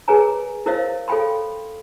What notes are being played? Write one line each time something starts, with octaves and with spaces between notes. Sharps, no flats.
G#4 A#4 B4 C#5 G#5 A#5
E4 A#4 C5 C#5 D#5 F5
A4 C#5 F5 G5 B5 C6